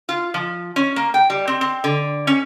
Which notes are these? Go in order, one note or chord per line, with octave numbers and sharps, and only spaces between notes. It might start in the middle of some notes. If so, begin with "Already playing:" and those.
F4
F3
C#4
A#3
G5
G3
C4
C4
D3
C#4